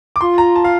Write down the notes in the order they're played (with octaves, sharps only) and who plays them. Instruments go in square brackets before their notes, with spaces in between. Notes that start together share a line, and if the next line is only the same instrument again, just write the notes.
[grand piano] D6
[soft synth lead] F4 [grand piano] C6
[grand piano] A#5
A5
F5